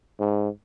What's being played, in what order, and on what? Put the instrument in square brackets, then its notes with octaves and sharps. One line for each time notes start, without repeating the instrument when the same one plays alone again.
[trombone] G#2